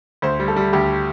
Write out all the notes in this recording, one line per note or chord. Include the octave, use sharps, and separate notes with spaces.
D2 C5
G3
A4
G3
D2 G4